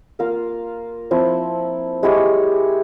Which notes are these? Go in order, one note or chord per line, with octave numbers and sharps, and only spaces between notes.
A#3 F4 A#4 F5
F3 C4 E4
G#3 E4 G4 C#5